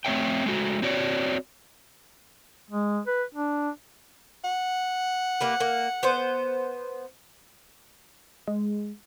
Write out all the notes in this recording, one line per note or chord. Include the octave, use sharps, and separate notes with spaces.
A3 C4 C#5 E5 G5
G#3 A3 F#4
C4 F#4 C#5 D5
G#3
B4
D4
F#5
A#3 G4 B4
A#3
B3 C5
G#3